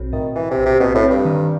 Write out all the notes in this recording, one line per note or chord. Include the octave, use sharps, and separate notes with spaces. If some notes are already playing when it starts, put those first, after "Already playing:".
Already playing: B1 C4
A2 D#3
A2 E3
C3
B1
C3
B2 C4
A2
C4
G2
D#3